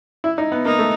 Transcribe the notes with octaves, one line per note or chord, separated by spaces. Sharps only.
E4
D#4
B3
A#3 D#4
A3